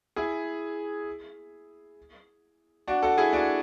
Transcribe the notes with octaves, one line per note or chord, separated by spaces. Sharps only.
E4 G#4
D4 F#4
F#4 A4
E4 G#4
D4 F#4